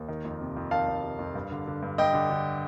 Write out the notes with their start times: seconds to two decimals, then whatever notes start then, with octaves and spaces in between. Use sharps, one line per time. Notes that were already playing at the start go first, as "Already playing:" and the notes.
Already playing: D#2
0.08 D#3
0.25 F2
0.41 C3
0.57 F2
0.71 D#3 F5 A5
0.88 F2
1.03 C3
1.19 F2
1.35 G2
1.51 D3
1.67 D3
1.82 G2
1.98 G2 D#5 G5
2.14 D3
2.30 D3